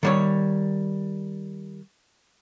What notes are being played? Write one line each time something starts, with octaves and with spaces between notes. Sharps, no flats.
D#3 G3 C#5